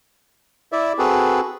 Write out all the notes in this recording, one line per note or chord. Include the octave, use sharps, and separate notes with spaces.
E4 D5 E5
C4 F#4 G#4 A4 B4